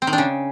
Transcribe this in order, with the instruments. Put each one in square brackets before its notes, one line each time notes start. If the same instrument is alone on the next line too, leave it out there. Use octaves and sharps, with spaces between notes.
[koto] C4
D#3
D4
C#3